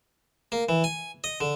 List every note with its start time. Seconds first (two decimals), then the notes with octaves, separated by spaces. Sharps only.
0.52 A#3
0.69 E3
0.84 G#5
1.24 D#5
1.41 D3